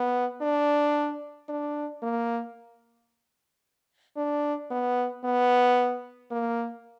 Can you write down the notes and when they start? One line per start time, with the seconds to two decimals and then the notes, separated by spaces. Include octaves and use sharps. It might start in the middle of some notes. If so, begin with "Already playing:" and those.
Already playing: B3
0.41 D4
1.49 D4
2.03 A#3
4.17 D4
4.71 B3
5.24 B3
6.31 A#3